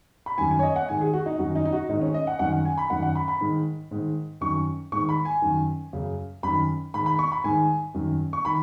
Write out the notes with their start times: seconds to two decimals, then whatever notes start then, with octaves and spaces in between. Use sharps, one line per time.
0.26 B5
0.38 F#2 D#3 G#5
0.51 G#5
0.59 C#5
0.63 D#5
0.76 F#5
0.88 G#2 D#3 G#5
1.01 G#4
1.13 F#4
1.26 D#4
1.39 F#2 D#3 F#4
1.55 D#4
1.65 D#4
1.73 F#4
1.89 G#2 D#3 D#4
2.02 C#4
2.14 D#5
2.27 F#5
2.39 F#2 D#3 F#5
2.53 F#5
2.65 G#5
2.78 B5
2.90 F#2 D#3 F#5
3.02 F#5
3.15 B5
3.28 B5
3.41 G#2 D#3
3.91 G#2 D#3
4.41 F#2 D#3 C#6
4.92 G#2 C#6
4.97 D#3
5.09 B5
5.25 G#5
5.42 F#2 D#3
5.93 F#2 C#3
6.43 F#2 D#3 B5
6.94 G#2 D#3 B5
7.06 B5
7.19 C#6
7.32 B5
7.44 G#2 D#3 G#5
7.94 F#2 D#3
8.33 C#6
8.45 D#3 B5